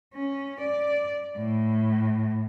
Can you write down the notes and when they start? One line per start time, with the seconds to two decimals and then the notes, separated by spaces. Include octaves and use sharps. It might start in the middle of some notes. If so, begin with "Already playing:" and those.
0.14 C#4
0.61 D5
1.37 A2